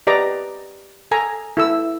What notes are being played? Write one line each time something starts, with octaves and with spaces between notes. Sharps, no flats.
G4 B4 D5 D#5 A#5 D6
A4 G#5 A#5
E4 A4 E6